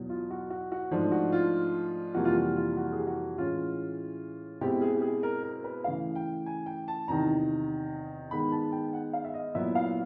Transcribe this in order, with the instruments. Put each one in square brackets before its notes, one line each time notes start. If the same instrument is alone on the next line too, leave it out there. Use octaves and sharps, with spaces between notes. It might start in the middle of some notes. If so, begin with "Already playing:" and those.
Already playing: [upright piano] E2 B2 F#3
F4
F#4
F#4
F#4
G#2 F3 A3 D4
F#4
F4
F2 C3 E3 G3 A#3 F#4
F4
F#4
F4
F#4
G#4
G4
F#4
A2 E3 G#3 C#4 F4
B2 G#3 C4 E4 G4
G#4
G4
G#4
A#4
A#4
B4
C#3 E3 A3 F5
G5
G#5
G5
A5
E2 C3 D#3 A#5
D#3 G#3 B3 B5
A5
G5
F#5
F5
E5
D#5
A#2 F#3 B3 E4 E5
F5